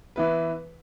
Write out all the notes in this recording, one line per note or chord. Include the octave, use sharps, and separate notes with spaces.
E3 B3 E4 B4